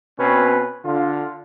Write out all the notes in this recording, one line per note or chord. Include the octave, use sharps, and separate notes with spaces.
B2 C4 C#4 B4
D3 F4